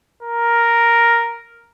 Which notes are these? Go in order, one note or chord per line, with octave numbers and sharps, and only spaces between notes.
A#4